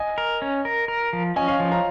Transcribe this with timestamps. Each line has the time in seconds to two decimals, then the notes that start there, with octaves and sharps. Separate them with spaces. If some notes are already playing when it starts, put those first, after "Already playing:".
Already playing: D#5 G#5
0.18 A#4
0.42 C#4
0.65 A#4
0.88 A#4
1.13 F3
1.36 C#4 D#5 G#5
1.48 C#5 F5
1.60 F3
1.72 F5 A#5